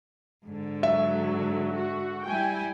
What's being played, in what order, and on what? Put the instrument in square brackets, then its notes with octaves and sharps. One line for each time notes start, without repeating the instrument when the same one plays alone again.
[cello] G#2 D3
[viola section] F#3 [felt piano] E5
[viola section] F#4
[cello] G3 E4 [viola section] G5 G#5